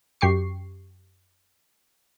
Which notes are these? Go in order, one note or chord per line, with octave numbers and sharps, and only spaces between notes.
F#2 G4 C#6 C7